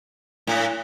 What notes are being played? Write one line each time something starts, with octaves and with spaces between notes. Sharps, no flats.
A2